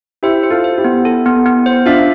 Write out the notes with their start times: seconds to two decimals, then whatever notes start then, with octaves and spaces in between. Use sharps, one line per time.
0.23 E4 G4 C5
0.43 C5
0.50 F4 A4
0.64 C5
0.78 E4 G4
0.84 B3
1.05 A4
1.26 B3
1.46 B3
1.66 C5
1.86 D4 F4 E5